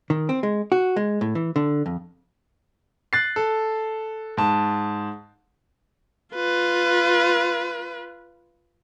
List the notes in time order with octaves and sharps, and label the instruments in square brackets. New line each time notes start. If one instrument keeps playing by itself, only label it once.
[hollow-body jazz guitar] D#3
C4
G#3
F#4
G#3
A2
E3
D3
F2
[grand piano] F#6 A6 C7
A4
G#2 A5
[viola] F4 B4